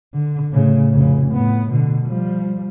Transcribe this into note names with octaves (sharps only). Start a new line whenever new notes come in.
D3
A2 C#3
F1 C#3
A2 B3
B2 D3
F3 G3